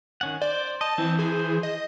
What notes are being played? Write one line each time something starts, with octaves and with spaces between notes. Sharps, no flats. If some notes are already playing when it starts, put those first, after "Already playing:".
D#3 C#4 F#5
C5 D5
D#5 A5
E3 C4
G#4 C5
D#5